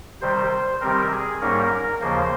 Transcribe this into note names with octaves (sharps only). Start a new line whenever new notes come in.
C3 D#3 G3 C5
C3 D#3 G3 C4 A#4
G#4
G#2 G3 A#3 C#4 A#4
D#2 C#3 F3 A#3 C5